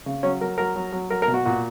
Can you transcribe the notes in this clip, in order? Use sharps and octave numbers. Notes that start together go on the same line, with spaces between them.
C#3
F#3 C#4
F#3 A#4
F#3 A#4
F#3
F#3
F#3 A#4
A#4
B2
F#4
A#2 F#4